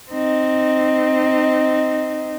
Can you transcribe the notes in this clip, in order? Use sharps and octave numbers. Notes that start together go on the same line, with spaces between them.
C4 D#4